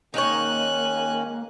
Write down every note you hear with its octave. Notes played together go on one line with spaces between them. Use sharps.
D#3 G#3 A#3 C#4 D#4 C#5 G#5 F#6